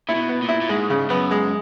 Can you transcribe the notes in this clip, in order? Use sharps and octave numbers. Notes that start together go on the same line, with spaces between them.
A#2 E4
B2
B3
A#2
E4
A#2
G#2 G#3
C#3
F#2 B3
G#3